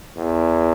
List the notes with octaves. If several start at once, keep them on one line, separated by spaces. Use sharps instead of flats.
E2